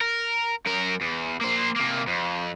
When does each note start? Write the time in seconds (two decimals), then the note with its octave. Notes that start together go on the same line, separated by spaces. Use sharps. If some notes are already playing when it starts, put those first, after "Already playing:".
0.01 A#4
0.66 F#2 A#4
1.01 E2
1.41 A#3 C5
1.76 C3 A#3
2.07 F2